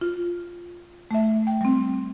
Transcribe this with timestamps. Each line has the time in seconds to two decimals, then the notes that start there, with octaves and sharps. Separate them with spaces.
0.01 F4
1.11 A3 E5
1.47 G5
1.61 G3 C4